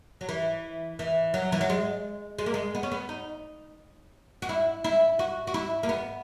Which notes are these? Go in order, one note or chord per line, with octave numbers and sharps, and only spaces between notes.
F#3
E3
E3
F#3
E3
F#3
G#3
G#3
A#3
G#3
B3
C#4
B3
D#4
F#4
E4
E4
F#4
F#4
E4
A#3
B3